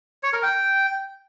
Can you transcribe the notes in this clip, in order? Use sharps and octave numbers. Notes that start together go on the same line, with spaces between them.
C#5
A#4
G5